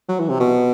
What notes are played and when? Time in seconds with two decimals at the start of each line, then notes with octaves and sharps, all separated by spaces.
0.08 F#3
0.19 E3
0.29 C3
0.40 B2